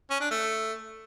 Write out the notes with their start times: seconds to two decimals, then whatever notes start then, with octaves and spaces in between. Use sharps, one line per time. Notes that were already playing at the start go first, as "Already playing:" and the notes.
0.10 C#4
0.21 D4
0.31 A3